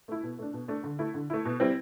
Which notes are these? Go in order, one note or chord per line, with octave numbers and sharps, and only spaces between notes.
A3 E4
B2
A3 D4
B2
A3 D4
D3
A3 E4
D3
A3 E4
B2
G3 C4 E4